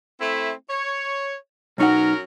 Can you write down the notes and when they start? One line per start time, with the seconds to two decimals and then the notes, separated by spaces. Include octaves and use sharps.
0.20 A3 C4 E4
0.69 C#5
1.78 B1 F#3 C#4 D#4 A#4 F#5